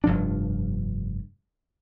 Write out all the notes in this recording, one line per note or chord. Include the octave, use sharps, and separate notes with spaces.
F1 G2 F3 D4